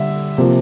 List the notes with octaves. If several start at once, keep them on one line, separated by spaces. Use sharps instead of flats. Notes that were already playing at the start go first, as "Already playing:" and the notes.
Already playing: D3 G3 E5
C3 F3 A#3